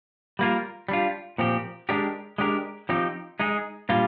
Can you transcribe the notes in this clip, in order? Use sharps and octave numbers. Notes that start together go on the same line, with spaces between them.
G3 A#3 F4 A#4
G3 D4 F4
A#2 F3 C4 G4
G#3 D4 G4 A#4
G#3 D4 G4 A#4
F3 C4 D#4 G4
G#3 D#4 G#4
A#2 G3 A#3 D4 F4